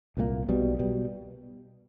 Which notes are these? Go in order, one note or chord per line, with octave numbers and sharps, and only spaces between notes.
C2 A#2 F#3 A#3
B1 B2 G3
B2 G3